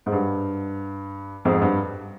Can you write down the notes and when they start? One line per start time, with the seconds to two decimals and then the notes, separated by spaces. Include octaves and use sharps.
0.06 G#2
0.12 G2
1.45 F2 G#2
1.62 G2